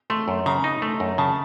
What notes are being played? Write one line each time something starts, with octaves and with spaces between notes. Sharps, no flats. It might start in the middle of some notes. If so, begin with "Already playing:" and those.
A3 C6
F#2
C#3 A#5
D#4
A3
F#2
C#3 A5